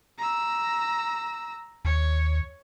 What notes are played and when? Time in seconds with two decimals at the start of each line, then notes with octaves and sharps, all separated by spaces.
0.18 A#5 E6
1.85 D#2 C#5